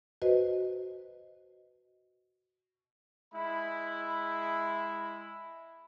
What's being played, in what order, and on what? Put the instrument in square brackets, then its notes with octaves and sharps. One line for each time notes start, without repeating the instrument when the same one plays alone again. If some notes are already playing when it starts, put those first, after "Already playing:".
[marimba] F#4 B4 C5 D#5
[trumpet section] G#3 E4 E5 B5